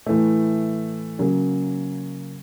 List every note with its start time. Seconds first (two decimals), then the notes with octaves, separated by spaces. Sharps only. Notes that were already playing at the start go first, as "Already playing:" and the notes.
0.06 A2 E3 A3
1.19 C#3 F#3 A#3 C#4